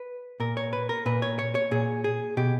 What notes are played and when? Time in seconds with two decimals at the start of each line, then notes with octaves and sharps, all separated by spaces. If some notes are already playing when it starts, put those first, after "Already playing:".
Already playing: B4
0.40 A#2 A#4
0.57 C#5
0.73 B4
0.89 A#4
1.06 A#2 B4
1.22 C#5
1.39 C#5
1.55 C#5
1.71 A#2 G#4
2.04 G#4
2.37 B2 G4